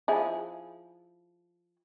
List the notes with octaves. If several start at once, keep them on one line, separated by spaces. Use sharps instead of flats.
F3 E4 G#4